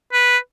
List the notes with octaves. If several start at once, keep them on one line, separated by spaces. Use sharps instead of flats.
B4